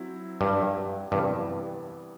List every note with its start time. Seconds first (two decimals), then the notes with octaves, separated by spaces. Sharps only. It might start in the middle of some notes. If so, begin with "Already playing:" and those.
Already playing: F#3 C4 E4
0.41 G2
1.12 G2 C3 E3 G3 B3